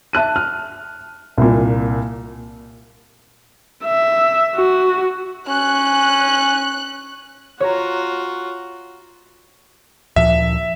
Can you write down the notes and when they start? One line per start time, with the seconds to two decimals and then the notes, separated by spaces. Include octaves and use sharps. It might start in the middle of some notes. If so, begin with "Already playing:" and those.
0.13 E5 A5 F#6 D#7
0.36 F6
1.38 C2 A#2
3.85 E5
4.56 F#4
5.48 C#4 F#6
7.60 F4 F#4 C#5 A#5
10.16 D2 A#2 F3 E5